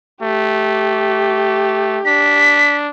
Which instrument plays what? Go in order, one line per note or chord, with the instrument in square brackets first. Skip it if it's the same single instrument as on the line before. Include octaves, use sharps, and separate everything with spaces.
[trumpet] A3 [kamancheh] G4
[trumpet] D4 [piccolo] B6